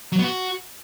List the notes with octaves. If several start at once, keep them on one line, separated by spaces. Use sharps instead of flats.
F#3
B3
F#4